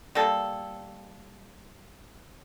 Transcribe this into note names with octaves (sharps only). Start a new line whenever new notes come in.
G3 A#3 A4